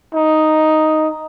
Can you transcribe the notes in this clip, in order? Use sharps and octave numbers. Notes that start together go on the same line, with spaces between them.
D#4